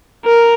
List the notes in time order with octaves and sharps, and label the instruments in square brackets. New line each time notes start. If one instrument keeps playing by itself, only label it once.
[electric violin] A#4